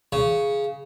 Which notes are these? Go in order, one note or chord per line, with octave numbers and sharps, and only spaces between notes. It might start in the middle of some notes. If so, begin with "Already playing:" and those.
C#3